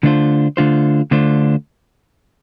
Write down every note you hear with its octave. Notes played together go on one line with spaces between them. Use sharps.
D3 A3 D4 F4 C5
D3 A3 D4 F4 C5
D3 A3 D4 F4 C5